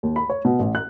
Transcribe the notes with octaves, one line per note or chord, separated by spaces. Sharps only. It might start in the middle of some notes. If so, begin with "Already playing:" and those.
D#2
B5
C#5
B2
A1
F#6